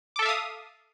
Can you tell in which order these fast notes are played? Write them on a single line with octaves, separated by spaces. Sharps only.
D6 A4 E5 F5 D#6